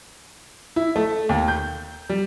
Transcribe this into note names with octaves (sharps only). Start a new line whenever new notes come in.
E4
A3
D#2
G6
G3